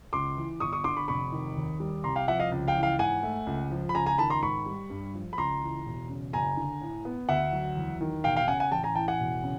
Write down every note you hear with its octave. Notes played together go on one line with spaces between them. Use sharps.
C#2 C6 D6
E3
G1 C#6 D#6
C#6 D#6
D3 C6 D6
B5 C#6
F1 B5 C#6
D#3
D#2
G3
C2 A#5 C6
F5 G5
F3 E5 F#5
D#5 F5
C#2
F5 G5
E3
F5 G5
G#2 F#5 G#5
A3
C#2
F3
B5
C#2 G#5 A#5
G#5 A#5
D#3 A5 B5
A#5 C6
G#2 B5 C#6
G3
G2
F3
B5
C#2 A#5 C6
E3
E1
C#3
F#1 G#5 A#5
D3
A2
B3
D2 E5 F#5
F#3
E2
D#3
E1 F5 G5
F5 G5
C#3 F#5 G#5
F#5 G#5
A1 G5 A5
G#5 A#5
E3 G5 A5
F#5 G#5
E1
C#3